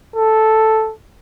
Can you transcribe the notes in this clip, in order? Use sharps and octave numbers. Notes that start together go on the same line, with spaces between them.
A4